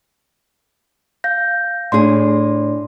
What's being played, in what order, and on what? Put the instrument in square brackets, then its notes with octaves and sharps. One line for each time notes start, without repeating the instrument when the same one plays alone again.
[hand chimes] F5 G6 A#6
[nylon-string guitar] A2 G#4 [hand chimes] D4 D5 C6